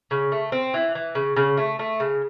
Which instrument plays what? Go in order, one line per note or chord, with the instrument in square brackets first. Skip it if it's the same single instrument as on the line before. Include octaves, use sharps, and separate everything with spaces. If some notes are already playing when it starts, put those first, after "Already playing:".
[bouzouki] C#3
A3
C4
E3
E3
C#3
C#3
A3
A3
C#3